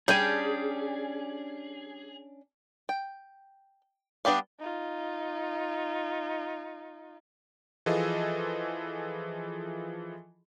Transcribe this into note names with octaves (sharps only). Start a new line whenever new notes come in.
G3 C#4 D4 G#4 G5 G#5
G5
G3 B3 D4 G4 F5
D#4 F4
E3 F3 F4 G#4 A4 D#5